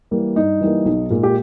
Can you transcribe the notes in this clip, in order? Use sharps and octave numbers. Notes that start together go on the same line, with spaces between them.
E3 G3 A#3
G2 D#4
E3 G3 A#3
B1
A#2 G#3
G4